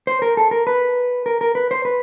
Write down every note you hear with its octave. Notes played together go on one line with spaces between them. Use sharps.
C5
A#4
A4
A#4
B4
A#4
A#4
B4
C5
B4